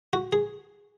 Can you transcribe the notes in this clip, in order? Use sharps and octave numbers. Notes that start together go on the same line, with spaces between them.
F#4
G#4